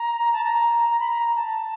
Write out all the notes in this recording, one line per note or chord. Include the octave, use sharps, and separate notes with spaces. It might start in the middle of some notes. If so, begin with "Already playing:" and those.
Already playing: A#5
A5
A#5
A#5
B5
A#5
A5